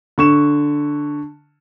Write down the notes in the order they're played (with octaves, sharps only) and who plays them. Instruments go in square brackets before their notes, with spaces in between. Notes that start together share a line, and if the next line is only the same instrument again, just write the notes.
[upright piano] D3 C#6 E7